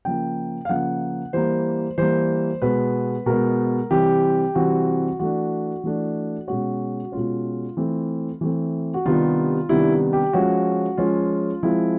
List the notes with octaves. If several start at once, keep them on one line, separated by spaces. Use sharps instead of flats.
C#3 F3 A#3 G5
F5
C#3 F3 A#3 F#5
E3 G3 A#3 C5
E3 G3 A#3 C5
B2 G#3 B3 B4
B2 G#3 B3 A#4
C3 E3 G3 C4 G4
C3 E3 G3 C4 F#4
E3 A3 D4 F#4
E3 A3 D4
B2 G#3 C#4 F#4
B2 G#3 C#4 F4
E3 A3 C4
E3 A3 C4
F#4
C3 D#3 G3 B3 D4 F4
C3 D#3 G3 B3 D4 E4
G4
F3 G#3 C#4 F#4
F3 G#3 C#4 F4
F3 G#3 C4 E4